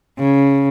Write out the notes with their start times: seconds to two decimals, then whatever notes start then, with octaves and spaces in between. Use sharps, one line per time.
0.19 C#3